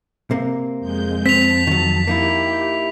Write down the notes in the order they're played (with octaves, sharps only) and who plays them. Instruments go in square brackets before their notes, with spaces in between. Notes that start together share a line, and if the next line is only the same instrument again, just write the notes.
[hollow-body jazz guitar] C3 A#3
[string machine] F2 G#3 G6
[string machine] F2 A5 [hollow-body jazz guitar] C4 [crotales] B6 F7
[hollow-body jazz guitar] D#3 F#3
[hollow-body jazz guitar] A#3 D#4 E4 [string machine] G4